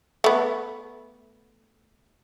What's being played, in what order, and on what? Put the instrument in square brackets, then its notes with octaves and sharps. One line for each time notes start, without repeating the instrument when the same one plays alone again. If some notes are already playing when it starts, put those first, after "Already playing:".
[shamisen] A3 B3